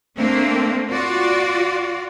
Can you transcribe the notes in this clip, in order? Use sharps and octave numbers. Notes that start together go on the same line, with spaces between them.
A3 A#3 C4 D4
F4 F#4 D5